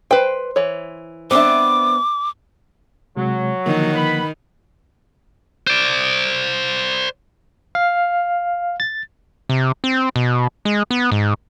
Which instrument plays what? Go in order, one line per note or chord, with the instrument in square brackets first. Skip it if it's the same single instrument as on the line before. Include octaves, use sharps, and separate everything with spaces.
[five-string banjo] B4 G5 [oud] C5
[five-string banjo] E3 C#5
[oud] B3 E5 [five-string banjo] C4 D4 [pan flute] D6
[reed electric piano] C3 G#3 [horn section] F#3
[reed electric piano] D3 F3 A#3 [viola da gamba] D#3
[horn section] B4 F#5 B5
[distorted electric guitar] C5 D5
[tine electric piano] F5
A6
[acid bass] C3
C4
B2
G#3
B3
G#2